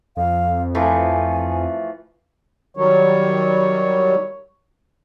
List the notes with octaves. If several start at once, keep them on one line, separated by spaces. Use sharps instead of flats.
F2 F5
E3 F3 A3 G#5
D#3 F#3 G3 C#5